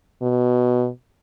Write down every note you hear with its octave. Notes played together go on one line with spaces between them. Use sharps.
B2